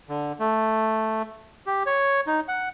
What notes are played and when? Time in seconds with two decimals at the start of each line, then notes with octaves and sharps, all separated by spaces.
0.09 D3
0.40 A3
1.67 G4
1.86 C#5
2.27 D#4
2.48 F#5